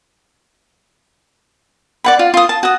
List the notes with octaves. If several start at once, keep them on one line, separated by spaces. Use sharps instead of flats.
D5 F#5 B5
F4
F4 D#6
A5
F#4 D#6